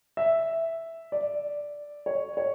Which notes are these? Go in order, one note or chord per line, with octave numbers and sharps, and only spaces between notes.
E5
D5
C#5
C#5